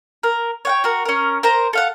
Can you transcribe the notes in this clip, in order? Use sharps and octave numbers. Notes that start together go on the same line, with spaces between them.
A#4
C#5 F#5 G5
F#4 A#4
C#4 A#4
A#4 C5 A#5
A4 F5 F#5